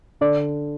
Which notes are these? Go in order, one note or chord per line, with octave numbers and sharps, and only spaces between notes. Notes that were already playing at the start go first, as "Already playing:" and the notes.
D3 D5